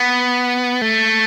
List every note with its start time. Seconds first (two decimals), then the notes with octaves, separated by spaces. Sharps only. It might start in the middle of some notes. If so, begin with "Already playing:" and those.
Already playing: B3
0.82 A3